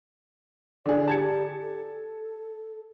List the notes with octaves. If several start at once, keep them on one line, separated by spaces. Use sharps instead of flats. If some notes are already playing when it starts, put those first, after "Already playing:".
D3 D4 G#4 D5
G4 A5 G#6 C#7
A4